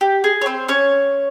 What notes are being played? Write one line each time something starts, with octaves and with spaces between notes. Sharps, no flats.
G4
G#4
C#5
C4 C5
C#4 C#5